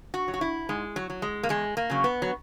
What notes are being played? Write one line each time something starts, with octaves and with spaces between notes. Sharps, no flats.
F#4
F#3
F#4
E4
G#2 G#3
F#3
F#3
G#3
A#3
E2 G#3
A#3
C#3 F#3
B3
F#3